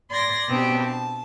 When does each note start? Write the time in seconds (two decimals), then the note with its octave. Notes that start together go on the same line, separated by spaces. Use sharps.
0.10 D5 C6 G#6 A#6
0.48 B2 B3 C4 D4 G4
0.82 A5